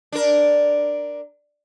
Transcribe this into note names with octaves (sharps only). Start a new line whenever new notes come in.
D4 A#4